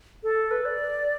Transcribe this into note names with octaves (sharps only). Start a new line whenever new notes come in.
A4
B4
D5